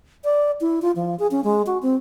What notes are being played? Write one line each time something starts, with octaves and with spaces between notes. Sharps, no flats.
D5
E4
F4
F3
G#4
C#4
G#3
F#4
C4